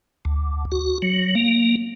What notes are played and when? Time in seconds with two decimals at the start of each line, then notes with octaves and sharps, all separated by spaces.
0.25 D2
0.72 F#4
1.02 F#3
1.35 A#3